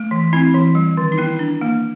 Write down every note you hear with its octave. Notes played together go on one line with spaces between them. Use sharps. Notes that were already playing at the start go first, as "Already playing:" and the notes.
Already playing: A3
E3
C4 E4
E3
G3
D#3
D#4
B3 E4
D4
A#3